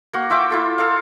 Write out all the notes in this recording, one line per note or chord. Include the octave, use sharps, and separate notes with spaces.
A#3 F#4
F4 E5 G5 D6
E4 F4 A4
A4 A#4 F5